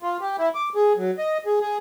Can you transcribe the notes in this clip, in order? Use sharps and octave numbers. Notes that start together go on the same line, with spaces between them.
F4
G4
E4
D6
G#4
F#3
D#5
G#4
G#4